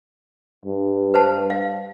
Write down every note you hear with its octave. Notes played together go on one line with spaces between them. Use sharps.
G2
B4 C5 A5
F5